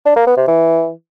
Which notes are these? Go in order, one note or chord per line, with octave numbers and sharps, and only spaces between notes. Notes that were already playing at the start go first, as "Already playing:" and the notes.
D4
A#3
B3
C3
E3